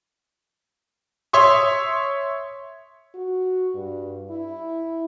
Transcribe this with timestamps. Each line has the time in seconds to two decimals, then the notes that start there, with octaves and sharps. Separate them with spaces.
1.33 C#5 E5 C6 C#6 D#6
3.15 F#4
3.74 G2
4.30 E4